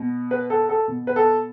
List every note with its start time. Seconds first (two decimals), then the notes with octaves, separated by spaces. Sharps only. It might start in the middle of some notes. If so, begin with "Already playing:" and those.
Already playing: B2
0.31 B4
0.50 A4
0.69 A4
0.88 B2
1.07 B4
1.16 A4